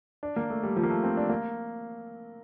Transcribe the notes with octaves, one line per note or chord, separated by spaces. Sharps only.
D4
A#3
A3
G3
F3
A#3
A3
C4
D4
A#3